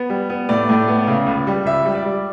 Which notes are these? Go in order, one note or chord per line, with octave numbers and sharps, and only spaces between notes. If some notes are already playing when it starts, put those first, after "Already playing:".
Already playing: B3
G3
B3
A2 D5
A2
B3
C#3
C#2
G3
C#2 E5
G3
D5
G3